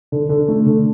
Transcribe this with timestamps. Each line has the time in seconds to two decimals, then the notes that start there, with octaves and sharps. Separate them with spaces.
0.12 D3
0.29 D3
0.48 A3
0.66 D3